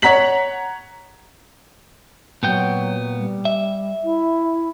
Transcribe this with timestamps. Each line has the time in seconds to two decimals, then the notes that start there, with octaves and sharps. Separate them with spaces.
0.02 C#5 F#5 A#5 B6 F#7
2.43 A#2 F#3 B3 G5
3.17 G3
3.45 E5
4.04 E4